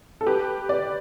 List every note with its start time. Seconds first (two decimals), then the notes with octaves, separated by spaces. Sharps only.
0.21 A4
0.26 G4 B4
0.69 B4 D5